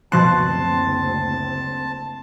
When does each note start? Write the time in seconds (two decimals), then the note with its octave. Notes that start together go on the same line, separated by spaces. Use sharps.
0.12 F#1 D2 B2 F3 C4 A5 C6 F#6